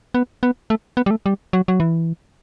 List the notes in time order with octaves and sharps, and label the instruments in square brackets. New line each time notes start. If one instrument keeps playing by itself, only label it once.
[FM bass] B3
B3
A3
B3
G3
A3
G3
F#3
F#3
E3